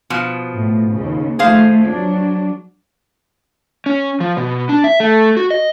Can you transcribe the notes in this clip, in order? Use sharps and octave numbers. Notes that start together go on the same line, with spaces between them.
B2 F3
A2
D#2 C#3
F3 A3 G#4 C5 F5
F#3 D4
C#4
F3
B2
D4
E5
A3
F#4
D#5